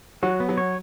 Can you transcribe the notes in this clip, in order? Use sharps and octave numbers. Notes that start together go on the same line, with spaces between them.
F#3 F#4
B3
F#3
C#5